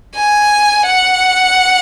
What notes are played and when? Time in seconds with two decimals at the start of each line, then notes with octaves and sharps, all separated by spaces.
0.16 G#5
0.88 F#5